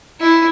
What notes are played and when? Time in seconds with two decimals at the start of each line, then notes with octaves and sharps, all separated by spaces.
0.21 E4